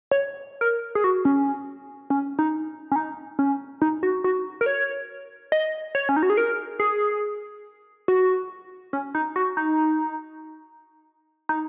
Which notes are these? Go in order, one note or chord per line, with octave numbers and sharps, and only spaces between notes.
C#5
A#4
G#4
F#4
C#4
C#4
D#4
C#4
D#4
C#4
D#4
F#4
F#4
A#4
C#5
D#5
C#5
C#4
D#4
F#4
G#4
A#4
G#4
F#4
C#4
D#4
F#4
D#4
D#4